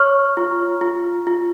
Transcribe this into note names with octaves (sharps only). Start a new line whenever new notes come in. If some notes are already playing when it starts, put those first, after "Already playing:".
Already playing: C#5 C#6 F6
F4
F4
F4